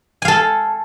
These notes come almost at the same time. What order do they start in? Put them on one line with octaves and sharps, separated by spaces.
G#5 F5 A4